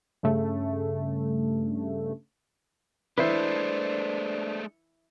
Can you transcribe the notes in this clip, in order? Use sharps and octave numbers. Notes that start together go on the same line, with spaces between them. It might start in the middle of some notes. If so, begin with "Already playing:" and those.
G2 C#3 A3
E3 G#3 A3 D4 E4 B4 C5 E5